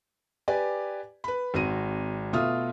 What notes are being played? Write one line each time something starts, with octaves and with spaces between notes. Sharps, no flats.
G4 B4 D5 G#5
B4 B5
G#1 C4 F#4 D#7
B2 A3 F4 E5 D#6 F6